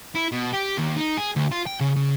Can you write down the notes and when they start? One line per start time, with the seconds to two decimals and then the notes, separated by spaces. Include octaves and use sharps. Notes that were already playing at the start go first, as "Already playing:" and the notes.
0.15 E4
0.32 B2
0.53 G4
0.77 D#2
0.96 D#4
1.17 G#4
1.36 D2
1.52 F4
1.67 G5
1.80 C#3
1.96 C#3